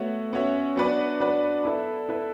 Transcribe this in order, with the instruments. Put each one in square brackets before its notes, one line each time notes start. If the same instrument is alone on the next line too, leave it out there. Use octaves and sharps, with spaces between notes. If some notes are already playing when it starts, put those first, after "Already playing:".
Already playing: [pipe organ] A3 [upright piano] B3 F#4 C#5 E5
[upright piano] B3 F#4 C#5 E5 [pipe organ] C#4
[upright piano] F#3 B3 F#4 B4 D5 [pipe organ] D4
[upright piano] F#3 B3 F#4 B4 D5
[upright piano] B3 E4 B4 E5 [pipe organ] A4
[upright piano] B3 E4 B4 E5